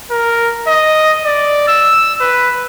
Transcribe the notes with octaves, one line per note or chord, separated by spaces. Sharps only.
A#4
D#5
D5
E6
B4